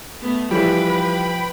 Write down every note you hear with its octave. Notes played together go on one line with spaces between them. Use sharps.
A3 B3
E3 F3 G3 B4 G5 B5